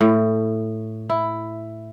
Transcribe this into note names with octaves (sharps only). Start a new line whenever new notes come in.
A2
E4